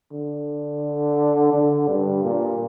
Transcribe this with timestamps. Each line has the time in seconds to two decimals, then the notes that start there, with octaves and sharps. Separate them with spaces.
0.12 D3
1.53 D3
1.88 G2
2.24 A#2